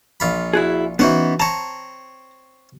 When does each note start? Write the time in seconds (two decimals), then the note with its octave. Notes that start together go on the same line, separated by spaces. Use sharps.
0.20 A#1 F4 B5
0.53 E4 F#4 G#4
0.99 E3 B3 C#4 D#4 F#4 C5
1.40 C4 C#5 A5 A#5